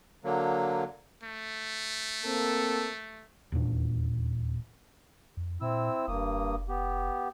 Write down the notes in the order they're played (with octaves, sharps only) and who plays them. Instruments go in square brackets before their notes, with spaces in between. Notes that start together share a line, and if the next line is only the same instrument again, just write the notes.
[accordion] D3 F#3 A#3
[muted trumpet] A3
[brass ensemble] A#3 C4 A4
[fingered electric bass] D#1 E2 A#2 D4
[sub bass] F2
[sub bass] A#2 [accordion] C4 E4 E6
[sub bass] F1 [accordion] G2 A#3 D#6
[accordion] B3 G4